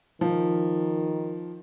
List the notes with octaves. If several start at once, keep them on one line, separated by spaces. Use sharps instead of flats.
D#3 F3